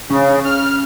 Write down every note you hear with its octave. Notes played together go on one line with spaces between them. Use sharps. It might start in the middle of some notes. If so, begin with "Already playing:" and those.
C#3 C#4
F6